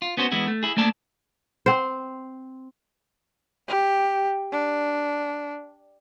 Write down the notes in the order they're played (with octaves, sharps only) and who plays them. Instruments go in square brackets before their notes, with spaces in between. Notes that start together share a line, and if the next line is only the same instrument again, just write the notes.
[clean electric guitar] F4
B3 C#4 F#4 C5
E3 G#3 B3 E4
A3
E4 G#4
A3 A#3 D5 A5
[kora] C4 C5
[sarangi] G4
D4